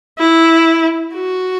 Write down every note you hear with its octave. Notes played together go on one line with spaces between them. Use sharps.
E4
F#4